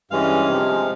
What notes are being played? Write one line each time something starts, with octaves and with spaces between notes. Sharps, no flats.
G2 E3 G#3 C#4 F5
C3 F3 G#3